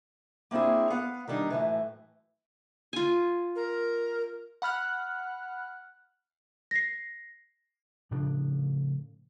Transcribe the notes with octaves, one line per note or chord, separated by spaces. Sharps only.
A#3 C4 D4 E4 G#4
B3 F5 F#5
D#3 G3 D4 D#4
F#2 A2 E3
F4 G#5
A#4
F#5 B5 F6 F#6
A#6 C7
A2 C#3 F3 D4